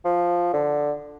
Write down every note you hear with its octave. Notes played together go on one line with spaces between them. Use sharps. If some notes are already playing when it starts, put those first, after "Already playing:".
F3
D3